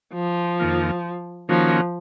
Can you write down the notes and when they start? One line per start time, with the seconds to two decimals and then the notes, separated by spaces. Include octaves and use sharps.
0.14 F3
0.59 F2 D#3 A#3 F4
1.49 D#3 F3 A#3 C#4 F#4